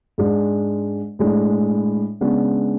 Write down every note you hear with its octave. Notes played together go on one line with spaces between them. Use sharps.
G#2 G#3 D4
A2 G#3 D4
C#3 G#3 B3 D4